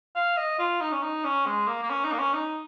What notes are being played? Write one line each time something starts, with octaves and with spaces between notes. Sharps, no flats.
F5
D#5
F4
D#4
C#4
D#4
C#4
G#3
A#3
A#3
C#4
D#4
A#3
C#4
D#4